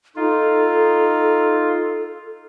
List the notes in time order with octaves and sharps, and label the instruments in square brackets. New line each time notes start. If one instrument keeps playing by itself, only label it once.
[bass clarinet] D#4 [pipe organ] F4 [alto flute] A4